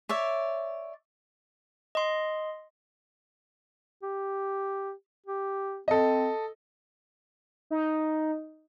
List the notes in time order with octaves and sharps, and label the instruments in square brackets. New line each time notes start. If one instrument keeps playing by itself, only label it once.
[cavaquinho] C#5 D5 E5
[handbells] D#5 C6
[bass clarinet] G4
G4
[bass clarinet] C4 [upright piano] A4 D#5
[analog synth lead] D#4